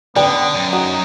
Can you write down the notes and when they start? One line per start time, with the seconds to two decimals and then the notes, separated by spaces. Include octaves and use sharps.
0.16 D3 B3 D5 G5
0.54 F#2
0.73 D#4 F#4